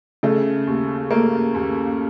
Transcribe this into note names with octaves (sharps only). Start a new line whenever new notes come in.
C#3 A3
D#2
A3 A#3
D#2